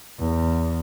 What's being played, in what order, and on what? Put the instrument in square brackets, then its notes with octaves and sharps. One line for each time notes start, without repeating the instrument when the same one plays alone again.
[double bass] E2